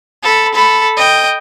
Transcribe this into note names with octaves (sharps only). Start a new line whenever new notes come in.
A4 B5
A4 B5
D#5 G5